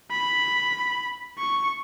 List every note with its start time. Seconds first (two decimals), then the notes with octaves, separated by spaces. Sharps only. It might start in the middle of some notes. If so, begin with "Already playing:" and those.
0.11 B5
1.38 C#6